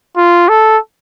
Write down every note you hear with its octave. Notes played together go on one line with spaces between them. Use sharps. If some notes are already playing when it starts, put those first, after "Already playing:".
F4
A4